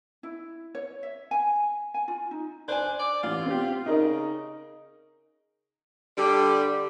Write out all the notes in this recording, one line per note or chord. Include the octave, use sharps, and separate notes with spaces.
E4
C#5
E5
G#5
G#5
F4
D#4
D4 C5 G#5
D5
A1 F4
C4 G4
C#3 D#4 A#4
D3 G3